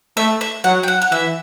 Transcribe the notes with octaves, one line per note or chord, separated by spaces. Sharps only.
A3 E5
E5
F#3 F#5
G5
F#5
F#5
E3 E5